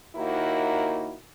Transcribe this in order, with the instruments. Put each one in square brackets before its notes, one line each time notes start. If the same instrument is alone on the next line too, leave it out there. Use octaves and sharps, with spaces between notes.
[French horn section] D#2 A#3 D#4 E4 F#4 A#4